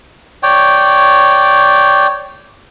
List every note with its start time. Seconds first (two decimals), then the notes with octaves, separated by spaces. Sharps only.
0.43 C#5 D5 G5